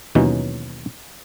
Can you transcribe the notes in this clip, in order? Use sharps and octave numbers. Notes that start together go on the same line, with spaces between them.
D#2 B2 E3 F#3 C#4 D#4